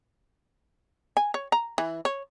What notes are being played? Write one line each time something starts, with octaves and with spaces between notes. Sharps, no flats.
G#5
C#5
A#5
E3
C#5